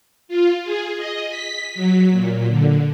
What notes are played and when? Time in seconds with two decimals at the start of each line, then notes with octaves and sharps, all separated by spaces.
0.28 F4
0.64 G#4
0.97 D#5
1.30 B6
1.75 F#3
2.11 A#2
2.47 D3